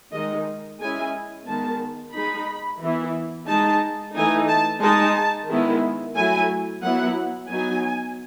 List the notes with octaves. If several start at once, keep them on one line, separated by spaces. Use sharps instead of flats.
D#3 G#3 D#4 D#5
G#3 C#4 E4 G#5
D#3 G#3 B3 A5
G#3 D#4 B5
E3 B3 E4
G#3 D#4 A5
E3 A3 D#4 G#5
A5
G#3 D#4 A5
D#3 G#3 B3 E4
F#3 A3 E4 G#5
F#3 B3 E4 F#5
F#3 B3 D#4 G#5